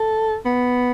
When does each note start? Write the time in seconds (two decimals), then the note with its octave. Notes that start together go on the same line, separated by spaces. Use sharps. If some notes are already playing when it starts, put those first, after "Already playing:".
Already playing: A4
0.45 B3